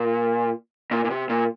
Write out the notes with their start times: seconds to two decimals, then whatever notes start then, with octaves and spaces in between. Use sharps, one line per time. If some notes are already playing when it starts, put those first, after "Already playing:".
Already playing: A#2
0.91 A#2
1.05 A#2
1.10 C3
1.30 A#2